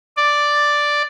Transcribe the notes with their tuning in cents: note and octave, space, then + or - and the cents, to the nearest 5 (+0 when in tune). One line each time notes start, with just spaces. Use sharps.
D5 +0